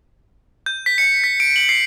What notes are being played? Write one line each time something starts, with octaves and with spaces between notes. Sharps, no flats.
G6
B6
C#7
B6
D7
F#7
C7